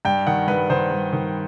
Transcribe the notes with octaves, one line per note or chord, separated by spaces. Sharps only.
G2 G5
D#3 F#5
G2 B4
D#3 C5
G2
D#3